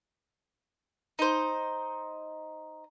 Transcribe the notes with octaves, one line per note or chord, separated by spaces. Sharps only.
D#4 C5